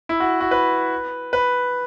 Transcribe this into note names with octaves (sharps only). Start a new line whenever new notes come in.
E4
F#4
F#4
B4
B4